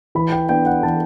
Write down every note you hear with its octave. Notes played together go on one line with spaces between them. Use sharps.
E3 B5
G5
B3 D4 G5
F#5
E3 A5